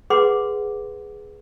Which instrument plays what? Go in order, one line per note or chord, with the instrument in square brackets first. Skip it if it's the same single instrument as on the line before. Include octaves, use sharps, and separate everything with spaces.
[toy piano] G#4 B4 F#5 C6 D6